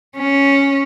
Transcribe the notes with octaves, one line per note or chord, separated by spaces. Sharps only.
C#4